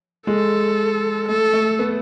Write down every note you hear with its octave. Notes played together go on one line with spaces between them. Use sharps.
G#3 A4
A3 A4
A3
B3